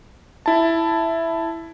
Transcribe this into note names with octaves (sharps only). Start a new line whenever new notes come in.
E4 A5